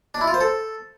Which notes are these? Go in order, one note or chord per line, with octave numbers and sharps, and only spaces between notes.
D4
E4
F4
C5
A4